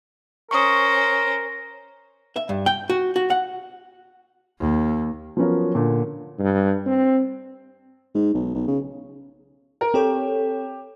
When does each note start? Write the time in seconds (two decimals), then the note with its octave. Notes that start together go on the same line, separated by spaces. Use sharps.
0.51 C#4 A#4 C5 C#6 D#6
2.36 E5
2.49 G2
2.66 G5
2.90 F#4
3.16 F#4
3.30 F#5
4.59 D#2
5.37 F3 F#3 B3 C#4 A#4
5.75 A#2 D3
6.39 G2
6.86 C4
8.15 G#2
8.34 B1
8.55 B1
8.68 C#3
9.81 A#4
9.94 C4 G4 A4 C#5